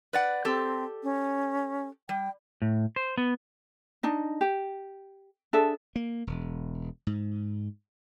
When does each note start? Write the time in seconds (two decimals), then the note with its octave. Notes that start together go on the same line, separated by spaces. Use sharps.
0.13 B4 D5 F#5
0.45 C4 G4 A4
1.03 C#4
2.09 G3 G5
2.62 A2
2.96 C5
3.18 B3
4.03 D4 D#4 D#5
4.41 G4
5.53 D4 G#4 A4 E5
5.96 A#3
6.27 E1
7.07 G#2